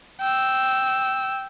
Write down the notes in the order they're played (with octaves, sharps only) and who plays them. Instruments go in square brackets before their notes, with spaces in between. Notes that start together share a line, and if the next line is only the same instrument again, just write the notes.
[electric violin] G5 E6